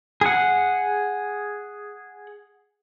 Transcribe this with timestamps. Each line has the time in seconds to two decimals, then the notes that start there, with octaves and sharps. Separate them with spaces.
0.21 G#4 F#5